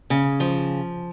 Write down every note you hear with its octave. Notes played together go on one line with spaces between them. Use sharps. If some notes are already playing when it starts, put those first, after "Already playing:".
C#3
F3